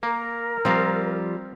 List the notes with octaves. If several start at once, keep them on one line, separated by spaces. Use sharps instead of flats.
A#3 A#4
F3 G3 C4 F5 A#5